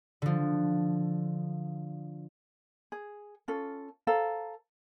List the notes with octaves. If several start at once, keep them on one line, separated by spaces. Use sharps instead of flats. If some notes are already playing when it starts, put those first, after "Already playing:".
D3 F3
G#4
C#4 F4 A4
A4 C5 F5 A#5